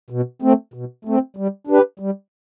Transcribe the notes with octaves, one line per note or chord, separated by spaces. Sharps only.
B2
A3 C4
B2
A3 C4
G3
D4 G4 B4
G3